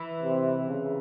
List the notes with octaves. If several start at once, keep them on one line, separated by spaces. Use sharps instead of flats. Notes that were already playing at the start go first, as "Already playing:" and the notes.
Already playing: E3
C3
C#3